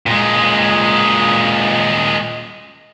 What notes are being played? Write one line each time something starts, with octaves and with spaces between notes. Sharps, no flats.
A#2 G#3